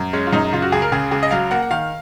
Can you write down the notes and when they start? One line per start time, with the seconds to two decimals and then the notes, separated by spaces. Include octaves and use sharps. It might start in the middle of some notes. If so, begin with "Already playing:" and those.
Already playing: F#2
0.13 G#3 C#4
0.27 F4
0.33 F#2 D#4
0.53 C#3 F4
0.62 F#4
0.72 C#2 G#4
0.82 A#4
0.92 C#3 G#4
1.11 C#2 G#4
1.23 D#5
1.31 F#3 F5
1.51 A#3 F#5
1.63 F#5
1.71 D#3 F5